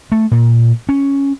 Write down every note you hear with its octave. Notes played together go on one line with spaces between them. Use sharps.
A3
A#2
C#4